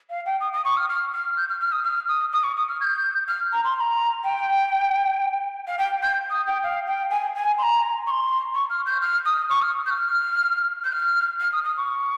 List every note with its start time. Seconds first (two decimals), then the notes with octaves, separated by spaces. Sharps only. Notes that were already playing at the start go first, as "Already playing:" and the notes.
0.10 F5
0.26 G5
0.41 D#6
0.53 D#6
0.65 C#6
0.77 F6
0.89 F6
1.13 F6
1.37 G6
1.49 F6
1.60 F6
1.72 D#6
1.84 F6
2.08 D#6
2.32 D#6
2.44 C#6
2.57 D#6
2.69 F6
2.81 G#6
2.84 G6
3.28 F6
3.53 A#5
3.65 C6
3.76 C6
3.81 A#5
4.24 G5
5.68 F5
5.79 G5
6.03 G6
6.30 D#6
6.47 G5
6.63 F5
6.87 G5
7.10 G#5
7.35 G#5
7.58 C6
7.63 A#5
8.07 C#6
8.11 C6
8.55 C#6
8.70 F6
8.86 G6
9.01 F6
9.26 D#6
9.50 C#6
9.62 F6
9.86 G6
9.91 F6
10.84 G6
10.93 F6
11.40 F6
11.53 D#6
11.64 D#6
11.77 C#6